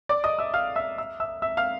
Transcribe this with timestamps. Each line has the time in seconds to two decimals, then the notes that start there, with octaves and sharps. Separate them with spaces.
0.09 D5 D6
0.24 D#5 D#6
0.39 E5 E6
0.54 F5 F6
0.76 E5 E6
0.98 E5 E6
1.20 E5 E6
1.42 E5 E6
1.57 F5 F6